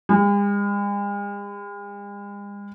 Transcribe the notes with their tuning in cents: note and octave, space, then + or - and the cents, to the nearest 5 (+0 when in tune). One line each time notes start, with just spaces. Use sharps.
G#3 -45